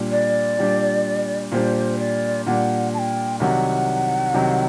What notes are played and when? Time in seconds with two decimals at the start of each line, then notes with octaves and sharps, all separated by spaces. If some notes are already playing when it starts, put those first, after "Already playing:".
Already playing: A#2 G3 D4
0.12 D5
0.58 A#2 G3 D4
1.52 A#2 G3 D4 C5
1.99 D5
2.46 A#2 G3 D4 F#5
2.94 A5
2.99 G5
3.40 C2 C3 D#3 F#3 F#5
4.34 C2 C3 D#3 F#3